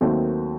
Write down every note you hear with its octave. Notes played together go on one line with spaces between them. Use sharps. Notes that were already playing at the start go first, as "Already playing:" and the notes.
D#2 D#3 F#3 A3 C4